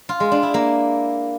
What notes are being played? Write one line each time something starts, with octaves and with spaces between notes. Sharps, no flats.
F4
G#3
D4
E4
A#3